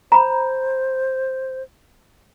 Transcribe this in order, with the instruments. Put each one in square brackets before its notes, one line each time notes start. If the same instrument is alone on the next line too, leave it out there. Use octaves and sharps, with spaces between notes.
[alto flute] C5 [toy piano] A#5 B5